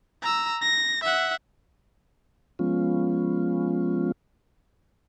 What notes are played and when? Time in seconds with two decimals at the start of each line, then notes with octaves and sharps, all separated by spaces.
0.23 A#5 E6
0.62 A#6
1.04 E5 F#5
2.59 F3 G#3 B3 C#4 F4